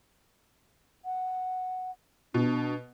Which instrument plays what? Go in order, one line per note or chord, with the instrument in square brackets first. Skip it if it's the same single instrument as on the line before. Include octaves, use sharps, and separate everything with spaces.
[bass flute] F#5
[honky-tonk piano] B2 [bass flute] D4